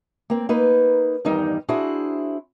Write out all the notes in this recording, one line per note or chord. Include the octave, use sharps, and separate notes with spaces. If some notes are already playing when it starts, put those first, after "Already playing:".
A#3 C4
A#3 D#4 B4
E2 G2 D#3 G3 D#4
D4 E4 F#4 G#4 C5